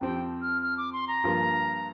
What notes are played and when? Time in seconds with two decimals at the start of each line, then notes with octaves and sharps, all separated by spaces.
0.01 F2 F3 C4 G4 G5
0.42 F6
0.62 F6
0.77 D6
0.93 C6
1.08 A#5
1.24 G2 F3 A#3 F4